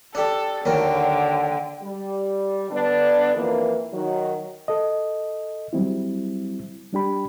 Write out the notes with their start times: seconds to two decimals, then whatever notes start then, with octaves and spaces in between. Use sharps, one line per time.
0.15 D4 G4 A4
0.66 D#2 D3 F#3 A#4 G5
1.82 G3
2.70 D3 B3 D4
3.35 F2 E3 A#3
3.92 D#3 F#3
4.68 A4 D#5
5.73 F#3 G3 C4 E4
6.93 G3 D4 G4 B5